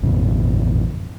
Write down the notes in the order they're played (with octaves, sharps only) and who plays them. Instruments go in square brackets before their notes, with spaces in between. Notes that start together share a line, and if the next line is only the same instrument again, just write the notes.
[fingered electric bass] A1 F2 B2